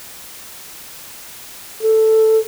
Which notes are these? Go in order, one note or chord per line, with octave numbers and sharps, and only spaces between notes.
A4